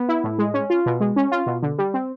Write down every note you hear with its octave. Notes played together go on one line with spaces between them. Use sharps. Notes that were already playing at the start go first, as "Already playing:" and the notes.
Already playing: B3
E4
A2
G#3
C#4
F4
B2
G#3
C#4
F4
B2
D3
G3
C4